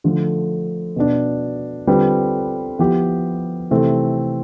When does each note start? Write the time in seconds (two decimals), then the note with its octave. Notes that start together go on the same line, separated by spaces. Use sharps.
0.04 D3 F3 A3
0.96 B2 B3 D4
1.87 D3 G3 C4 F4 B4
2.79 F3 B3 E4 G4
3.71 C3 E3 A3 C4